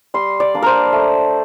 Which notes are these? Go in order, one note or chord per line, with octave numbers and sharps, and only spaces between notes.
G3 C6
D5
A#3 D4
A#4 C5
A3